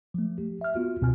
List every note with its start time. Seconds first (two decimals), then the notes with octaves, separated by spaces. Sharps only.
0.14 F3 A3
0.38 G4
0.61 E5 F6
0.75 B3 F4 F#4
1.01 C#2 B2 C4 F4 G#5 F6